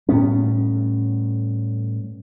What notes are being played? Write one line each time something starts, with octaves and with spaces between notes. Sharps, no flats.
A2 G3 B3 C#4